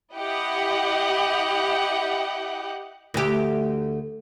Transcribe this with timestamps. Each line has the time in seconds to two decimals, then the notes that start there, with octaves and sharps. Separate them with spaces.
0.15 E4 G4 D#5 F#5 G5
3.14 D2 G4